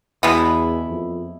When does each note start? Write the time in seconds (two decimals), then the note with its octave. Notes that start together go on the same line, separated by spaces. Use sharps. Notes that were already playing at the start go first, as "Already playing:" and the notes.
0.23 E2 B2 G#3 B3 E4
0.90 F2